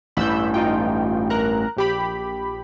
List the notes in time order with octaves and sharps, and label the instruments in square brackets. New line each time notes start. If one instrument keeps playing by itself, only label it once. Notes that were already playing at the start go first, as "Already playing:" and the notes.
[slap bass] A1 G2 E3 [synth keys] B5 E6 G6
[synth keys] D#4 F4 G5
A#4 A#5 F#6
A#1 G4 B5